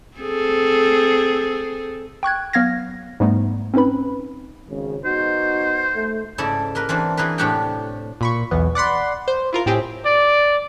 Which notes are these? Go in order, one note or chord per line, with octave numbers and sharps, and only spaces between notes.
C4 G#4 A4
G5 C#6 F#6 G#6
F#3 B3 F5 F6 G#6 A#6
G#2 G3 A3 B3 D#4
C4 C#4 D#4 B4 B5
G#1 C#3
B3 D#4 F#4 C5
A3
G#2 C#3 E4 A4 D5
A#3 A#4 B4
E3 C4 D4
E3 G#4 A#4 B4
A2 C3 D4 G4 F#5 G5
A#2 B5 C#6
B1 E2 B3
D5 F#5 B5 C6
C5
E4 F4 A#4
A2 C4 G4 G#4
D5